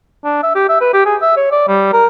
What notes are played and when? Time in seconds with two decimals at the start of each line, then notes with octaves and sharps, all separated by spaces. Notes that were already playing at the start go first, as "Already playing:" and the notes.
0.24 D4
0.43 E5
0.55 G4
0.69 E5
0.81 B4
0.93 G4
1.05 G#4
1.22 E5
1.37 C#5
1.52 D5
1.68 G3
1.93 A#4